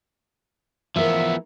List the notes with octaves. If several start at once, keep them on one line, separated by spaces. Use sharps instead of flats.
E3 F3 A3 B3 A#4 E5